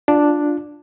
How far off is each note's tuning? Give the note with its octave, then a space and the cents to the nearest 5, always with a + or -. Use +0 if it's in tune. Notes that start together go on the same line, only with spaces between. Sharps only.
D4 +0 F4 +0